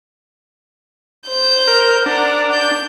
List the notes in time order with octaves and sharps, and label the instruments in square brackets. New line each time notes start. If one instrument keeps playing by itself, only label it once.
[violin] C5 G6
[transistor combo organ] A#4
[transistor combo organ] D4 [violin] A#4 F#5
[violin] G6